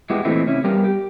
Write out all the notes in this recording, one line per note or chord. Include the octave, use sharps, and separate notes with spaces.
G#2 G#3 B3 E4 F#4 G4
A#2 E3 A3 C4 D#4 E4
C3 C#4 E4
G3 B3 G4 A#4 F5
G4